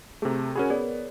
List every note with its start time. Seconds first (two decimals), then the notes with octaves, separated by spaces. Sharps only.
0.22 C3 A3 E4 G#4
0.56 C#4 F#4 G#4 A#4 B5
0.70 B3 G#4 C#5 D5